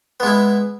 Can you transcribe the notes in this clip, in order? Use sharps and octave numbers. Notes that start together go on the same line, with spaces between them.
G#3 B3 E4